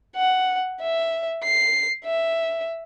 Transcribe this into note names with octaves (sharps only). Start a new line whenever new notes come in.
F#5
E5
C7
E5